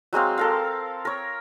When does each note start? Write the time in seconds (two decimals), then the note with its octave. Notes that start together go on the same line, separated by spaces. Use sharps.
0.13 F#3 G#3 C4 F5
0.38 A4 A#4 F5
1.05 A#4 C#5